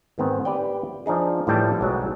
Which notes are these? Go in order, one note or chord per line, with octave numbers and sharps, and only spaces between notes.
G#2 D#3 B3 C4
G4 B4 D5 G5
F3 D4 D#4 G#4
A2 E3 F3 G3 G5 A5
B1 F#3 G#3